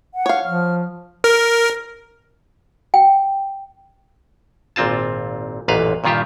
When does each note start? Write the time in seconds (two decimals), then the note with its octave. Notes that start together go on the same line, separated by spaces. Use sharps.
0.14 F#5
0.26 C#5 F5
0.45 F3 F6
1.24 A#4
2.94 G5
4.76 G#1 A#2 C4 F4 A5
5.68 A1 F#2 A#2 B4 F5
6.04 G2 A#2 D#3 F4 G4 E5